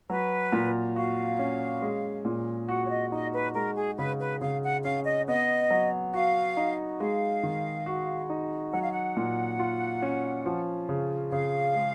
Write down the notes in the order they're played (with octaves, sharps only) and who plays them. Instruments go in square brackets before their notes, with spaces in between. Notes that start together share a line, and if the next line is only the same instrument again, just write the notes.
[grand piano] F#3 [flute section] B4
[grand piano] A#2
[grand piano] F#4 [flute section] F5
[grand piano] C#4
G#3
A#2
[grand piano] F#4 [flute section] F#5
[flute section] C#5
D#5
[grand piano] D#4 [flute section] D#5
[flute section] B4
[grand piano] G#3 [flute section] A#4
[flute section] G#4
[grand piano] C#3 [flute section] B4
[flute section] B4
[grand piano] C#3 [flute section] F5
[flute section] F#5
[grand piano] C#4 [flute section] F5
[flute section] D#5
[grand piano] B3 [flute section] D#5
[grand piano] F#3
[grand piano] F#4 [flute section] F5
[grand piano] D#4
[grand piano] G#3 [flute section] F5
[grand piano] D#3
F#4
D#4
[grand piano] F#3 [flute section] F#5
[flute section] F5
F#5
[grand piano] A#2
F4
C#4
F3
C#3
[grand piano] C#3 [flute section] F5
[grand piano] G#3